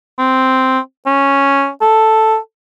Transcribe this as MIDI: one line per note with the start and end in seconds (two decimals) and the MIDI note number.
0.18 0.79 60
1.06 1.69 61
1.82 2.37 69